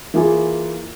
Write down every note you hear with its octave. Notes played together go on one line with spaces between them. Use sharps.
E3 A#3 F4 G#4